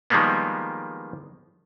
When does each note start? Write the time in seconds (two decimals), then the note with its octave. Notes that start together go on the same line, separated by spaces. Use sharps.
0.10 D#3 F3 G3 G#3 A#3 B3